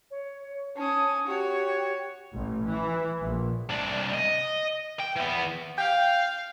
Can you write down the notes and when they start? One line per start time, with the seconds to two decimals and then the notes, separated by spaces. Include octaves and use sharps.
0.11 C#5
0.77 C#4 A5 D#6
1.27 F#4 G4 C#5
2.35 A1
2.67 E3
3.21 A#1
3.70 C2 D4
4.14 D#5
5.00 G5
5.17 E3 B3
5.78 F5 G5